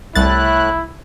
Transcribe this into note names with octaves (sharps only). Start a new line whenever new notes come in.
C2 A2 A3 E4 F#6 A6